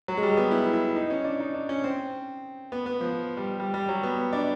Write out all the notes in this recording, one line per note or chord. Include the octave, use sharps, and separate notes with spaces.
F#3
G#3
G3
B3
E4
E4
D#4
C#4
D4
D#4
D4
C#4
C4
B3
B3
F3
G3
G3
G3
F#3
B3
D4